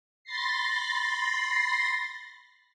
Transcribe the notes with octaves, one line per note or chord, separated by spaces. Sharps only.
B5 C6 A6 A#6 C7